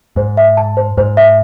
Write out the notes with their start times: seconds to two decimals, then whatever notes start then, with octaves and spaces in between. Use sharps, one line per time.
0.16 G#2 C5
0.37 E5
0.57 A5
0.77 C5
0.97 G#2 C5
1.17 E5